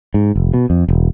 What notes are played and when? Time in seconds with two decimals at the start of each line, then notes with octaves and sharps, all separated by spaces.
0.14 G#2
0.35 F1
0.54 B2
0.70 F2
0.88 E1